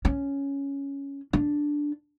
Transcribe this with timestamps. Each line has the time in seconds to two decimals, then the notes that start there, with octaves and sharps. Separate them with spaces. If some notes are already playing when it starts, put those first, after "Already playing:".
0.05 C#4
1.33 D4